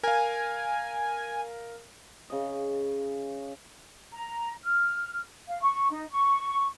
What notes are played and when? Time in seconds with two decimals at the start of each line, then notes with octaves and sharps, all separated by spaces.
0.03 A#4 F5 G#5
2.30 C#3 D#5
4.12 A#5
4.63 F6
5.47 F5
5.62 C#6
5.91 D#4
6.10 C#6